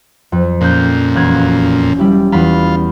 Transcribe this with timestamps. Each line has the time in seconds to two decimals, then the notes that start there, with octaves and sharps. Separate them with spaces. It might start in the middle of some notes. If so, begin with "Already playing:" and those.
0.32 F2
0.61 F2 A#2 C#4 F#6 G6
1.15 E1 F#6 G#6
1.98 G3 E4 G4
2.32 E2 F4 B5